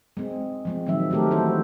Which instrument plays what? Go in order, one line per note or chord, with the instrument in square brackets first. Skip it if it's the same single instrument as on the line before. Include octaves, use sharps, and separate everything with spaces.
[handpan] G#3 C4
F3 G#3 C4
A#2 D#3 F3 F#3 G#3 E5
D#3 A3 C4 G4 A4 A#4
E3 A#3 E4 F#4 A4 C5